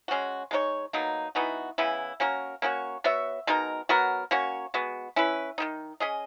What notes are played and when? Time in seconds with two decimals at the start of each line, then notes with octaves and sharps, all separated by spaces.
0.08 G#3 C#4 F#4
0.51 G#3 D#4 A#4 C#5
0.93 B2 F#3 A#3 D#4
1.35 E3 B3 D#4 F#4
1.78 C#3 E3 B3 E4
2.20 A#3 C#4 F#4 A#4
2.62 A#3 C#4 F#4 C#5
3.04 B3 F#4 C#5 E5
3.47 B2 G#3 D#4 A#4
3.89 F#3 B3 F#4 A#4
4.31 A#3 C#4 F#4 C#5
4.74 G#3 B3 F#4
5.16 C#4 E4 B4
5.58 D#3 A#3 D#4
6.00 C#4 G#4 D#5